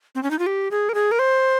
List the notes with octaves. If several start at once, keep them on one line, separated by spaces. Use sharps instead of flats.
C4
C#4
D#4
F4
G4
G#4
A#4
G#4
A#4
C5